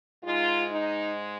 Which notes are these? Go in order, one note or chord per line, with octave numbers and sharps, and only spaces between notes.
G#2 G#3 D#4 F4
D#4